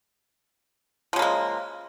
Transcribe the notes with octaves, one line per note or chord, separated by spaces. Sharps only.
C#3 F3 G#3 A#3